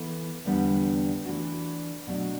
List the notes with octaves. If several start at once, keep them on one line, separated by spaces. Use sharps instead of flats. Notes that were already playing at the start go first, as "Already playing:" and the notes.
Already playing: E3 B3 E4 A4
E2 D3 G3 B3 D4
E3 A3 D4 F#4
B2 F#3 A3 D4 F#4